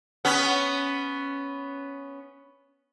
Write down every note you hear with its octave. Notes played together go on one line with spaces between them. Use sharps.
B3 C#4